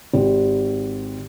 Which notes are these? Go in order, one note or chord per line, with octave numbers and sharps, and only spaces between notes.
G#1 G4